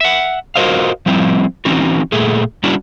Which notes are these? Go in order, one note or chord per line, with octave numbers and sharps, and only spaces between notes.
E5 F#5
F4 F#4 A#4 C5 D#5 F5
F3 G3 C4 E4
E3 C4 C#4 D#4 F#4
A#2 A3 G#4
G3 C#4 D4 E4 F#4